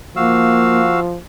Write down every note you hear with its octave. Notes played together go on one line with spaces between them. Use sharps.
F3 A#3 F#4 F5 E6